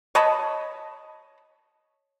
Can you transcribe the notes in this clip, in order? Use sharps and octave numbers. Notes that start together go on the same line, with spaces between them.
C#5 D#5 A5 B5